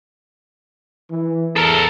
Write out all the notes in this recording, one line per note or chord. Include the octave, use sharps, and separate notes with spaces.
E3
E2 A4 A#4